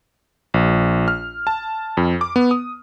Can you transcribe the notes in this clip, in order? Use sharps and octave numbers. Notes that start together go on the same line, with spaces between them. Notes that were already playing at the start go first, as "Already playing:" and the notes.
A#1
F6
A5
F2
D6
B3
D#6